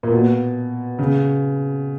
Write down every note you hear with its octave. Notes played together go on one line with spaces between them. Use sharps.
A#2
B2
C#3